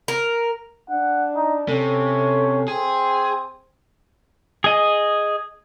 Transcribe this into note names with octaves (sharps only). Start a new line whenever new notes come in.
A#4
D4 F#5
D#4
C3 C#4 A4
C4 G#4
G#4 D#5